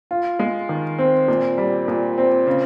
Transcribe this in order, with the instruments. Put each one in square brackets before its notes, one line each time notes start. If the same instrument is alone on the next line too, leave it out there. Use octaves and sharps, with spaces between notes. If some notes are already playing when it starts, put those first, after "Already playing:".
[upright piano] F4
G#3
D#3
C4
A#2
G3
A#2
C4
C#3